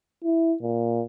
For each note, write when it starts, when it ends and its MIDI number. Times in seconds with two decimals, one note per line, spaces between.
0.24 0.55 64
0.63 1.03 46